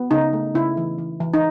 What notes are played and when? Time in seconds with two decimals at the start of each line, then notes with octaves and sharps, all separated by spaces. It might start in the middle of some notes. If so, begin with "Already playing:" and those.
Already playing: B3
0.11 C#3 D#4
0.33 A3
0.55 C#3 E4
0.77 E3
0.98 E3
1.20 E3
1.34 D#4